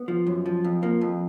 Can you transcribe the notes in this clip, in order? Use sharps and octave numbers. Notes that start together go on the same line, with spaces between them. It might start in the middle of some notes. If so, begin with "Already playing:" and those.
Already playing: B3
F3
F#2
F3
F2
F3 A#3
F2